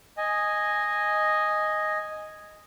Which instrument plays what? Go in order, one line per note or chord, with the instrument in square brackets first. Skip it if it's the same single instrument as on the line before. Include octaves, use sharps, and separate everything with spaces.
[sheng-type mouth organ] D#5 G#5